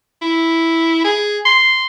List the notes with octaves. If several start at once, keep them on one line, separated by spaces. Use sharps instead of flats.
E4
G#4
C6